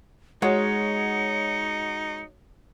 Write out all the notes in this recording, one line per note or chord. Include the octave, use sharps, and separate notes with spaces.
G#3 D#4 F#4 C#5 C#7